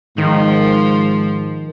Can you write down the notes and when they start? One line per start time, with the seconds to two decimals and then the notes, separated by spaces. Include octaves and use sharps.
0.18 G#2 D#3 F3